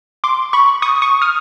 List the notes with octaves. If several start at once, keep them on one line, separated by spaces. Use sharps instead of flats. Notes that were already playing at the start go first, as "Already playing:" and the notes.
C6 D6
B5 C#6
C#6 D#6
C#6 D#6
D#6 F6